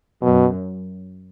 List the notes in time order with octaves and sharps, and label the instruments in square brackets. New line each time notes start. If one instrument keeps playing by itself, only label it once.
[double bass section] F#2 [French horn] B2